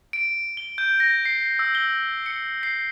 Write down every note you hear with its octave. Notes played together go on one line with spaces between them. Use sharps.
D7
G7
G6
A#6
C7
E6
G7
C#7
C7